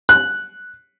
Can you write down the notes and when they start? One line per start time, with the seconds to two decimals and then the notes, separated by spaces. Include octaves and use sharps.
0.09 F#6